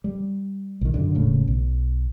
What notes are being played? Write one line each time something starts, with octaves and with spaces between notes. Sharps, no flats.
G3
B1 D#3
F#2 D3
E1 A2 C#3
B1